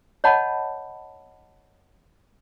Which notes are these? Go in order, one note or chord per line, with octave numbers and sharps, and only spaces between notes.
C#5 D#5 F#5 A5 B5